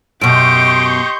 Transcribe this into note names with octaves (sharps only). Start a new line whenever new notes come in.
F#2 B2 G4 D#5 C6 C#6 G6 D7